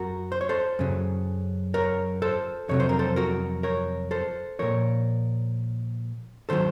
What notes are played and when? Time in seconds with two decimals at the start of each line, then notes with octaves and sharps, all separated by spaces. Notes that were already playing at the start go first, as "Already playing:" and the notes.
Already playing: F#2 F#3 F#4 A#4
0.32 C5
0.41 C#5
0.49 A4 C5
0.79 F#2 C#3 F#3
1.74 A#4 C#5
2.22 A4 C5
2.69 F2 C3 F#3 C#5
2.80 C5
2.89 A#4
2.99 A4 C5
3.16 F#4 A#4
3.63 A#4 C#5
4.11 A4 C5
4.59 A#2 F3 A#4 C#5
6.49 D#3 F#3 A4 C5